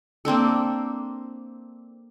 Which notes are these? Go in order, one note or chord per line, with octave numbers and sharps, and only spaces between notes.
A#3 C4 D4 A4